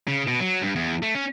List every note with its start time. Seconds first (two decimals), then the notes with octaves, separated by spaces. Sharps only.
0.08 C#3
0.28 B2
0.40 F#3
0.62 G2
0.76 E2
1.02 A3
1.15 C#4